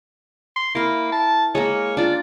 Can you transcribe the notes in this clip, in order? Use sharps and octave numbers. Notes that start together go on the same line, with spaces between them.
C6
A#3 E4 A#4
A5
G#3 A#3 C#5
D4 F4 D5